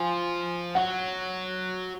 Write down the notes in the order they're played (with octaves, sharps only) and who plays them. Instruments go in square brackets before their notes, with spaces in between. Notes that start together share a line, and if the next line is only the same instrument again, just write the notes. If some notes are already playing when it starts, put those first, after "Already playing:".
Already playing: [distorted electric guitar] F3 [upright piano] G#5
[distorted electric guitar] F#3 [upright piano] F#5